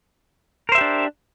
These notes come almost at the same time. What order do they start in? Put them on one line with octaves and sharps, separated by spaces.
A#4 C5 E5 G4 D4